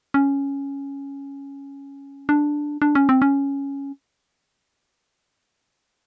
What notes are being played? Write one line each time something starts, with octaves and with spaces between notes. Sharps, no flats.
C#4
D4
D4
C#4
C4
C#4